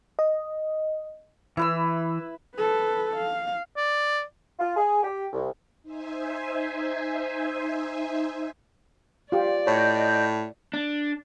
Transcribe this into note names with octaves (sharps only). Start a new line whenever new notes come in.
D#5
E3 E4 B4 E6
A4 B4
F5
D5
F4
G#4
G4
C2
D#4 C5 E5 G#5
F4 G4 D5
A2 C#5 D#5 G6
D4